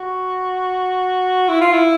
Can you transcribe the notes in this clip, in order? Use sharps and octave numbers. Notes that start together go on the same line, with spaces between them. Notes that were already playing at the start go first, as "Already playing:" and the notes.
Already playing: F#4
E4
F4
E4